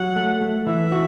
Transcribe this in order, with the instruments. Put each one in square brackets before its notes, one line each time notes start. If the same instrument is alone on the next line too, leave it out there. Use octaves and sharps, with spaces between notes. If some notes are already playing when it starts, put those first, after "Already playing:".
Already playing: [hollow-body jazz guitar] F#3 [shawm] F#5
[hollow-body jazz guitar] A3
A3
[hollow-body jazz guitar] E3 [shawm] E5
[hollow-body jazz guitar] F#4